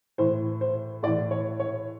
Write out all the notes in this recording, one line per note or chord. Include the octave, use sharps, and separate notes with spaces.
A2 E3 C5
C5
A2 E3 D5
C#5
C#5